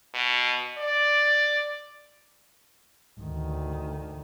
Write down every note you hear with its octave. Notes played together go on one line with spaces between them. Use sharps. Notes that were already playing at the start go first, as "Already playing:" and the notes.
B2
D5
D2 D#3